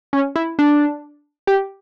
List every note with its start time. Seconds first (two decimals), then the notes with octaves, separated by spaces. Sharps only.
0.13 C#4
0.36 E4
0.59 D4
1.47 G4